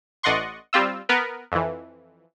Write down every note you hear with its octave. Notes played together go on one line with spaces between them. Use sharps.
A1 D5 D#5 F#5 C6 C#6
G3 C4 F4 E6
B3 A#4 B4
F2 E3